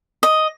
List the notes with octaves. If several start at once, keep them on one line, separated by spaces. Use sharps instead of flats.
D#5